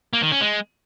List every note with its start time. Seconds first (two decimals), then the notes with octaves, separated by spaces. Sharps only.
0.13 A#3
0.23 D#3
0.32 C#4
0.41 G#3